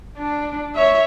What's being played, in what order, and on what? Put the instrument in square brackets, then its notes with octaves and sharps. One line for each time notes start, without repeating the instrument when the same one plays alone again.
[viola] D4
C#5 E5